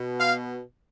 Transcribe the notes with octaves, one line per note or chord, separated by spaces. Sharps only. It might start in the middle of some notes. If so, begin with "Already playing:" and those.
Already playing: B2
F5